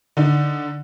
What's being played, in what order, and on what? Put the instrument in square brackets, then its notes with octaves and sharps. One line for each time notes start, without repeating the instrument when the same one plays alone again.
[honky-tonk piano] D3 D#4